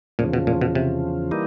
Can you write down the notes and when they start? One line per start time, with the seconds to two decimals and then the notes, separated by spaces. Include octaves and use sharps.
0.19 E2 A#2 C#3 F3
0.33 B2
0.47 A#2
0.61 B2
0.75 C3
1.31 E3 G3 A#3 D#4